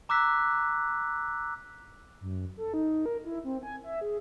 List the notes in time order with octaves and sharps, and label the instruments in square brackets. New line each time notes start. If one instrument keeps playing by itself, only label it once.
[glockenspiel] A#5 D6 E6 F#6 B6
[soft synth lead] F#2
A4
D#4
A#4
E4
C4
G#5
E5
G#4